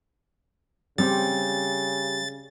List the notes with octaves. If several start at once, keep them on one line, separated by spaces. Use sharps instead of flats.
C#3 G3 C4 G4 A6